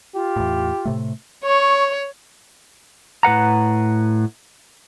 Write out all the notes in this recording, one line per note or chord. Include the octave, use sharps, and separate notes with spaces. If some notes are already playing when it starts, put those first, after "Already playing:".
F4 G4
E2 A2
A2 C3 A3
C#5 C#6
A2 B4 F#5 A#5